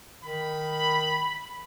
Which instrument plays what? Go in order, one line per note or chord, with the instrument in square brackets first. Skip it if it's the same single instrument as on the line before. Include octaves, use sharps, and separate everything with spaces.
[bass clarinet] D#3 [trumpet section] B5